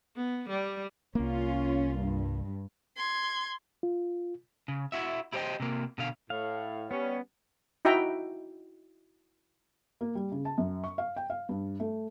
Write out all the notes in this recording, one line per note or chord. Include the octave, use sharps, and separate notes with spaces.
B3
G3
C2 A#3 C#4 F4
G2
C6 G#6
F4
C#3
E4 F#4 E5
E4 G4 C5 C#5 D#5 G5
C3 A#3
B2 D3 F5
A2 F5
G3 B3 C#4
D#4 E4 F#4 E5 G5 A#5
A#3
G3
C#3
A5
F#2
C#6
F5
G5
F5
G2
A3